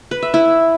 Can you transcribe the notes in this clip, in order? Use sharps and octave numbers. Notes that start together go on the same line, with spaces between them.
B4
E5
E4